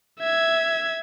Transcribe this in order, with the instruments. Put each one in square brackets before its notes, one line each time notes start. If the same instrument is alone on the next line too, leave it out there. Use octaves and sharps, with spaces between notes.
[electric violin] E5 G#6